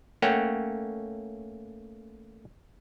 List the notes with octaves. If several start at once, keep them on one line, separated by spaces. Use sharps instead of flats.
A3 A#3 C#4 C#5 F#5 G5